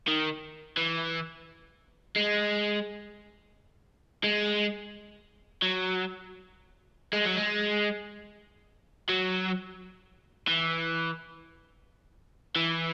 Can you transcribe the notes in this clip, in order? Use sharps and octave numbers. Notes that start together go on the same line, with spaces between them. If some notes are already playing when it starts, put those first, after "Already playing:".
D#3
E3
G#3
G#3
F#3
G#3
F#3
G#3
F#3
E3
E3